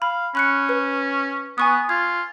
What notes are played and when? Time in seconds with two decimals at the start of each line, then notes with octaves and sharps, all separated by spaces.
0.02 F5 B5
0.35 C#4 B5 F#6 C#7
0.69 B4
1.58 B3 G#5 C#6 D#6
1.89 F4 G#6